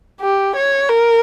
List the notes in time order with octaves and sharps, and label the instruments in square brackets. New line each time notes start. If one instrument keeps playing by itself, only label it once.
[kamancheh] G4
C#5
A#4